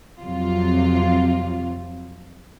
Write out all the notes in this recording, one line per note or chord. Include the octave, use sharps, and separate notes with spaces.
F2 C3 F#3 F4